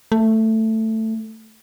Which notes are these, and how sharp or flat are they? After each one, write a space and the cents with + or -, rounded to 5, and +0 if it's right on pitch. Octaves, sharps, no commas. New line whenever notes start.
A3 +10